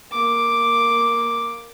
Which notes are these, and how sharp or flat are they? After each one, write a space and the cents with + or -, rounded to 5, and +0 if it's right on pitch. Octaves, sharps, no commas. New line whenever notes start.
A#3 +0 D6 +0